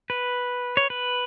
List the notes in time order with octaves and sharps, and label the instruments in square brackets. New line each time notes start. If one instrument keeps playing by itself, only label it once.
[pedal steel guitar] B4
C#5
B4